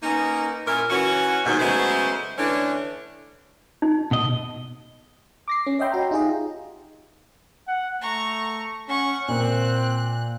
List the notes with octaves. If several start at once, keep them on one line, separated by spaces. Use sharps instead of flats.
A#3 B3 C#4 D#4
A#2 A#3 C#4 E4 A#4
E3 C#4 F#4
D#2 G#2 B2
C#3 F#3 G#3 A3 B3 C5
D3 E3 A3 C#4 D4
D#4
B2 D#5
D6 A#6 C7
C#4
C#5 D#5 E5 G5 B5 C6
F#4 A#5
D#4 F4 G4 G#4 D#5
F#5
A3 A#5 C#6
C#4 F#5 C#6
A#2 C4 A#4 F#6